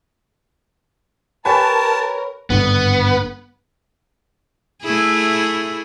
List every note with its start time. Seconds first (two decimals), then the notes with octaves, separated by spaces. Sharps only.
1.45 G4 A#4 B4 C#5 G#5 A5
2.50 G#1 G2 D3 B3
4.83 A3 E4 G#4